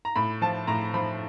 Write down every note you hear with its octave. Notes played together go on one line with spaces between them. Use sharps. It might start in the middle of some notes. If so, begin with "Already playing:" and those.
A#5
A2 B5
F3 A5
A2 A#5
F3 B5